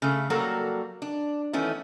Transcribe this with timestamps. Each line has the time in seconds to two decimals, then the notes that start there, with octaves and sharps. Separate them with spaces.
0.02 C#3 A3
0.30 F#3 G3 A#3 F#4 A4
1.02 D4
1.53 D#3 E3 A3 B3 C#4